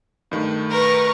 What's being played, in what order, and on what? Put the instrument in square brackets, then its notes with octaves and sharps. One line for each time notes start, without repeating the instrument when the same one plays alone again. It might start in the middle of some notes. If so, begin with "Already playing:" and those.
[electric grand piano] G2 D#3 A3
[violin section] A#4 B4 C#6